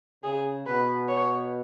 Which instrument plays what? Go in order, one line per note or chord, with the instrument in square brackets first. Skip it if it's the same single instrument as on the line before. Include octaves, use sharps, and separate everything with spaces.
[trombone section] C#3 [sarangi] G#4
[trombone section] B2 [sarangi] B4
[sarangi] C#5